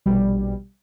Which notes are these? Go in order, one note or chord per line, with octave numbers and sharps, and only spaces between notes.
A#1 B2 G3